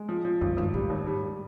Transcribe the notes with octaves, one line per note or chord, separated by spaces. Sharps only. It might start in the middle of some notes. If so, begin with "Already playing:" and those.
Already playing: G#3
F3
F3
G#1 F#2
G#1 G2
G#2 G3
D#2
G3
G3